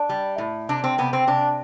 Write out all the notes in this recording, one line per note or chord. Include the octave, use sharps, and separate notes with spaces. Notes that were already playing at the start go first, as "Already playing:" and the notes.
Already playing: D4
G3
A2
C3 D4
C4
C3 B3
C4
C3 D4